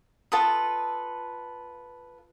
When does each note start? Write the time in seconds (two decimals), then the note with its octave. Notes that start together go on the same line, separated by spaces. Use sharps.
0.32 F4 A4 B4 D#6